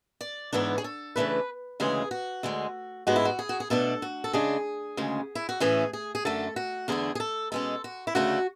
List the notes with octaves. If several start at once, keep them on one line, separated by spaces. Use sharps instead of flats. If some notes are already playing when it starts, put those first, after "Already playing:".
D5
G#2 E3 B3 D4 C#5
G#4
A4
C#3 E3 A3 D4 B4
D2 C#3 E3 G#3 G#4
F#4
D2 D3 G#3
G#2 G#3 B3 F#4
E4
F#4
G#4
F#4
G#4
B2 A3 D4 A4
F#4
A4
C#3 G#3 D4 G#4
D2 C#3 G#3 C#4
E4
F#4
A2 E3 A3 C#4 G#4
G#4
G#4
F#2 D3 A3 A4
F#4
E2 D3 A3 D4 G#4
G#4
A4
B2 G#3 C#4 A4
F#4
E4
D2 C#3 F#3 A3 D4 F#4